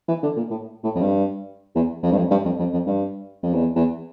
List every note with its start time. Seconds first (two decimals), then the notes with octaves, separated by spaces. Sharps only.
0.08 E3
0.23 D3
0.36 A#2
0.50 A2
0.83 A2
0.95 F2
1.02 G2
1.75 E2
2.03 F2
2.12 G2
2.18 F2
2.31 G2
2.45 F2
2.59 F2
2.73 F2
2.87 G2
3.43 F2
3.54 E2
3.76 E2